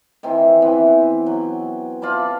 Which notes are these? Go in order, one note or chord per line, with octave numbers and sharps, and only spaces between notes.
D#3 E3 C4
E3 B3 C4
F#3
F4 D5 A5 B5